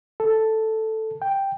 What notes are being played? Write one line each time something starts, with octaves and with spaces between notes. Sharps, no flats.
A4
G5